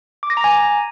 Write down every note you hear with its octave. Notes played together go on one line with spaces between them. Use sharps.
D6
A#6
A#5
G#5